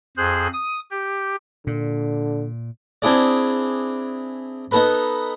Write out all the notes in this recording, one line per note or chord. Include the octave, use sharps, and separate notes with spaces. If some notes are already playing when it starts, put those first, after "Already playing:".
F2 G#4 C5 F#6
D#6
G4
A#2 D3
C4 D4 E4 G#4 D5
B3 D#4 A4 B4 B5